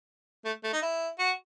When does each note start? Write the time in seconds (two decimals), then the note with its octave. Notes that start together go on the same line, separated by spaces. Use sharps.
0.45 A3
0.64 A3
0.73 D#4
0.82 E4
1.19 F#4